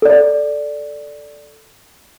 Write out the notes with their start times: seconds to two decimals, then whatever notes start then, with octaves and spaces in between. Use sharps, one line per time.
0.02 A4 D5